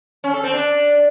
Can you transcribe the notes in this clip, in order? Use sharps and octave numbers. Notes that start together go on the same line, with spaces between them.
C#4
A4
C4
D4